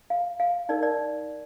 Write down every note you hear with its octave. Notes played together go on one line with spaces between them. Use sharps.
F5
F5
D#4 A#4 D5
D5